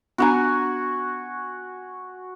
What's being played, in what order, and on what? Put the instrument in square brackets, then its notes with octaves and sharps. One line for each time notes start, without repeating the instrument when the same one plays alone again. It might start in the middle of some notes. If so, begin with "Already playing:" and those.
[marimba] B3 D4 A#5 [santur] F#4 F#5 G#5